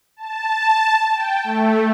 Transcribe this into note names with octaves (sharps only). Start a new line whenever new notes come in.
A5
G5
A3